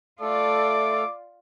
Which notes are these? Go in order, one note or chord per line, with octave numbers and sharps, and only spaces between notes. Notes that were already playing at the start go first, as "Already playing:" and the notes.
A3 F4 A4 D5 D6